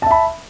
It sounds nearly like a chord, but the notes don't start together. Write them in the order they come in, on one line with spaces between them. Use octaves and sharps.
A5 E5 B5